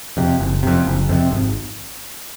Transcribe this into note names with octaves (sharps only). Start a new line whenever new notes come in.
F2 C3
F#1
F2 C3
F#1
F2 C3
G#1